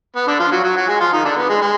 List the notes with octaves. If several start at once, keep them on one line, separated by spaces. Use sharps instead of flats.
B3
D3 D4
F3 F4
F#3 F#4
F#3 F#4
F#3 F#4
G#3 G#4
F3 F4
D#3 D#4
D3 D4
B3
G#3
G#3